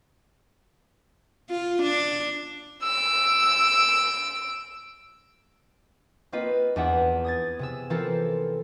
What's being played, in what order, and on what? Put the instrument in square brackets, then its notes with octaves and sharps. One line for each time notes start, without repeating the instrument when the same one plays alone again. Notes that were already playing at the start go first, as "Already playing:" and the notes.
[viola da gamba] F4
D4
[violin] E6 D7
[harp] A#3 C4 F4 B4 D#5
E2 D4 E5 F#5
D#6 G#6 A6
C3 G#4 E6
E3 C4 F4 A4 A#4 C5